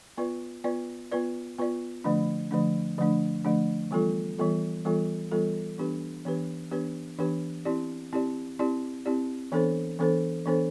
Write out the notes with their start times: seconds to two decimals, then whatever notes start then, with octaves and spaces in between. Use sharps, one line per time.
0.18 B3 F4 B4 D5
0.64 B3 F4 B4 D5
1.11 B3 F4 B4 D5
1.58 B3 F4 B4 D5
2.04 D3 F3 A3 D4
2.51 D3 F3 A3 D4
2.98 D3 F3 A3 D4
3.45 D3 F3 A3 D4
3.91 E3 G3 B3 F4 A4
4.38 E3 G3 B3 F4 A4
4.85 E3 G3 B3 F4 A4
5.31 E3 G3 B3 F4 A4
5.78 E3 B3 D4 G4 B4
6.25 E3 B3 D4 G4 B4
6.71 E3 B3 D4 G4 B4
7.19 E3 B3 D4 G4 B4
7.65 C4 E4 G4 D5
8.13 C4 E4 G4 D5
8.59 C4 E4 G4 D5
9.06 C4 E4 G4 D5
9.52 E3 B3 D4 A4 C5
9.99 E3 B3 D4 A4 C5
10.45 E3 B3 D4 A4 C5